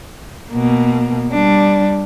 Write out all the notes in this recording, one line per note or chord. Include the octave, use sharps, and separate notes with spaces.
B2 A#3
G3 D4